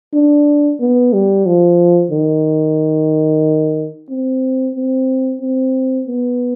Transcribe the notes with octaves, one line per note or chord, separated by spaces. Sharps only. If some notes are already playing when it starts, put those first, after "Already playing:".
D4
B3
G3
F3
D#3
C4
C4
C4
B3